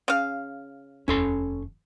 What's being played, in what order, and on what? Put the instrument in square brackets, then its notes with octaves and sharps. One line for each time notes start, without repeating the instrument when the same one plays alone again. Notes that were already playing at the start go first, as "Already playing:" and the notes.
[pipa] C#3 F5
[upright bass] F1 D#2 [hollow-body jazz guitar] C#4 A4 C6